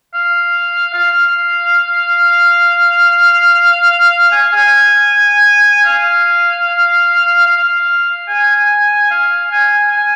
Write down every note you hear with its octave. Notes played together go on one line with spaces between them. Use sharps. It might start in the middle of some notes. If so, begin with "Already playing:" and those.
F5
F5
G#5
F5
G#5
F5
F5
G#5
F5
G#5
G#5